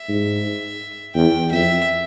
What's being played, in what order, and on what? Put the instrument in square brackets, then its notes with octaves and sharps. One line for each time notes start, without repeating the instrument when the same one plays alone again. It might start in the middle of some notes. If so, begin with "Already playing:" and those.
Already playing: [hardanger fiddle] E5
[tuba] G#2
[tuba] E2 [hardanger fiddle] G5
[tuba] F2 [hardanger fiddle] E5